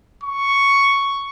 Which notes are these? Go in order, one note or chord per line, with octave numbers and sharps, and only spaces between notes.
C#6